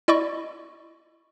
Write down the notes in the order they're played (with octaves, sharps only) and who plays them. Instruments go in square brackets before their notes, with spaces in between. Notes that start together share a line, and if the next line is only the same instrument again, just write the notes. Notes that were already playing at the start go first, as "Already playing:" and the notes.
[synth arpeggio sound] E4 D5 D#5 B5 C#6